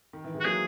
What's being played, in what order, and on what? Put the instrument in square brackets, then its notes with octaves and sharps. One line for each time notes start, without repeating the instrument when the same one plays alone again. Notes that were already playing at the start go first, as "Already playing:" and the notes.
[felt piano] D#3
E3
E3 G#3
[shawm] F#4
[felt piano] F#3 A#3 [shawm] G#4